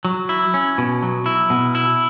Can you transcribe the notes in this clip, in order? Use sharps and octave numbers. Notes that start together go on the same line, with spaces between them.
F#3
E4
C#4
B2
F#3
E4
B2
E4